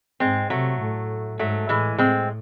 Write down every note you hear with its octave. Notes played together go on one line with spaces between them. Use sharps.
G#2 G#3 C4
C3 F#3 A3
A2
G#2 F#3 A3
A2 E3 G#3
A2 G#3 C4